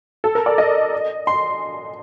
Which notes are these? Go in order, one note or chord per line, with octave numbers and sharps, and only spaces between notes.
A4
A#4
D5
D#5
C6